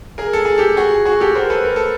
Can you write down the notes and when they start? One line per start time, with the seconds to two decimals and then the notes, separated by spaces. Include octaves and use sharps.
0.18 G#4 A#4
0.33 A4
0.45 G#4
0.58 G4 A4
0.77 F#4 G#4
1.05 F#4 G#4
1.20 G4 A4
1.35 A#4 C5
1.50 A4 B4
1.65 A#4
1.76 A4